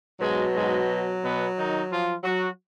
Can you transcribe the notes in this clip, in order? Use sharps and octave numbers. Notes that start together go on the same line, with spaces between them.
G#2 B2 F#3 G#3
G#2 G#3
B2 B3
D#3 D#4
F3 F4
F#3 F#4